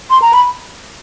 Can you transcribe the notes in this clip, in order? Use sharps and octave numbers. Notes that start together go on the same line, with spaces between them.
C6
A#5
B5